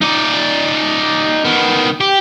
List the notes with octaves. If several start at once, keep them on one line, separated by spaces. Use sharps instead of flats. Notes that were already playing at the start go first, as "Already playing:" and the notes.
D#4 D5
D#3 B3
G4